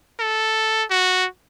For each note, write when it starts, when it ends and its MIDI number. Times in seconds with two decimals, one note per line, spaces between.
0.20 0.84 69
0.90 1.26 66